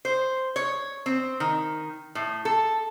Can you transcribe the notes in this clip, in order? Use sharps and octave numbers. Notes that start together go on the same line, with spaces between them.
C5
C#5
C4
D#3
A2
A4